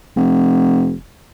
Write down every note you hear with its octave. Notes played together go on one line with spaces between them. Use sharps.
F1